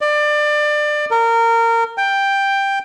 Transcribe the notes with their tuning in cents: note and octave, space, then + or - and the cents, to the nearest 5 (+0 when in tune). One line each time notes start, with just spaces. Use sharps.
D5 +25
A#4 -20
G5 +10